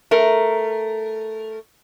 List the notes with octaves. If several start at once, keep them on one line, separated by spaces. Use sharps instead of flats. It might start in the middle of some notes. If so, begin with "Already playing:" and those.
A3 A#4